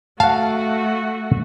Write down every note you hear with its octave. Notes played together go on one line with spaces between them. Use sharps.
A3 F#4 F5 F#5 A5